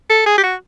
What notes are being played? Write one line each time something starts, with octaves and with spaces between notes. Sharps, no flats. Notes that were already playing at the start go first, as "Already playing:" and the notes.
A4
G#4
G4
F#4